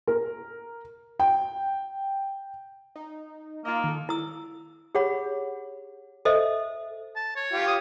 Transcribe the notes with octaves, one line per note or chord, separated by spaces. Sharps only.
A#4
G5
D#4
A#3 F4 D#5
D#3 A4
E4 E6
G4 G#4 C#5 F#5 B5
A4 C5 D#5 E5
A5
C#5
F4 G4
D#6